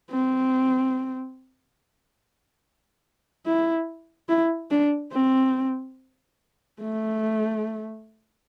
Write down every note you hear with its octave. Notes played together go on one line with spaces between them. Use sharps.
C4
E4
E4
D4
C4
A3